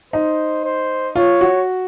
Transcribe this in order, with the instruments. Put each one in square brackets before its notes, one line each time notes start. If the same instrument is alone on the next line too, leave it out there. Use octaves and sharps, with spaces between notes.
[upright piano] D#4 [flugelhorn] C5
[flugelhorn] C5
[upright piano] F4 [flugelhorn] C#5
[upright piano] F#4